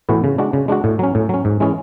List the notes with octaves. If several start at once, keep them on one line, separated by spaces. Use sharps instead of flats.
A2 E3 B3 F#4
C#3
G#3 D4 F#4
C#3
G#3 D4 F#4
A2
F#3 C#4
A2
F#3 C#4
G#2
E3 G#3 C#4 G#4